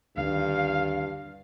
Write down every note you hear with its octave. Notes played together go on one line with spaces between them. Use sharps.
D2 G2 D3 D#3 F5